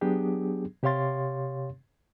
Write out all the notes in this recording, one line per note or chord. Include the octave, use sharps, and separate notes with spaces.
F#3 B3 D4 G4 G#4
C3 G4 C#5 F5 C6 A6